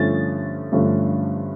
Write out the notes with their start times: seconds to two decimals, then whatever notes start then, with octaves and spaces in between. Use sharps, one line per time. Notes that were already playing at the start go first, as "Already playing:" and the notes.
Already playing: G2 D3 F3 A3 C#4 A6
0.72 G2 D3 F3 A3 C#4